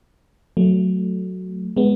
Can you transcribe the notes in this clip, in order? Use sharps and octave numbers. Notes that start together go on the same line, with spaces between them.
F#3 A3
G#3 B3